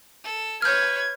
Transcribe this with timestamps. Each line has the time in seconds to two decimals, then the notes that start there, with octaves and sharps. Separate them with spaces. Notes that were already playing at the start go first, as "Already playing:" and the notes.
0.24 A4
0.62 B4 C#5 F6 G6 G#6